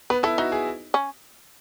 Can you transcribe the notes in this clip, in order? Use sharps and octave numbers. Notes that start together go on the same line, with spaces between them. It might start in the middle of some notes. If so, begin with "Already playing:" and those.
B3 B4
E4 A4
D#4 F#4
G#4
C#4